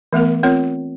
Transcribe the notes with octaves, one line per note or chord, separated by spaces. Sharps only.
E3 A3 B3 A#4
C4 F4 A#4 C#5